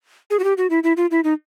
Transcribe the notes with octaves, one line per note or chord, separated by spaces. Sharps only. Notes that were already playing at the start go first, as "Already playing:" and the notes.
G#4
F#4
G4
F#4
E4
E4
F4
E4
D#4